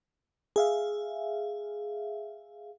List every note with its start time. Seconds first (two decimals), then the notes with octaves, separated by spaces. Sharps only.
0.56 G#4 E5 F5